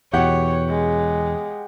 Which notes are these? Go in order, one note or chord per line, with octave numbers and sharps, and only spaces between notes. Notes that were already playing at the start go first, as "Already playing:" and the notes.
E2 B2 G4 C#5 F#5
G#3